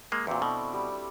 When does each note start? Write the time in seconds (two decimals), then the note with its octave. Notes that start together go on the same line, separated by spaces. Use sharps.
0.12 G#3 A#3
0.27 E2 A#2 C4 D4 F#4
0.42 B2 E4 A4
0.73 G3